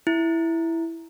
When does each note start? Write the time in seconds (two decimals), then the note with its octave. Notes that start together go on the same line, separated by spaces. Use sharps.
0.07 E4